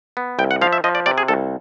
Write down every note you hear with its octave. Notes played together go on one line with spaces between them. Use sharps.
B3
C2 G5
F#5
F3 F5
E5
F3 D#5
D5
C3 D5
G#4
C2 A4